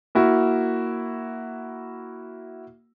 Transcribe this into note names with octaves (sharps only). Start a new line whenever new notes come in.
A#3 E4 F#4